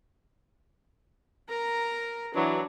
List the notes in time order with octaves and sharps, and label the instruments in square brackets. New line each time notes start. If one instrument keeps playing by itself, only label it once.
[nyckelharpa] A#4 A#5
[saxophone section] E3 F#3 [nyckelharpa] D4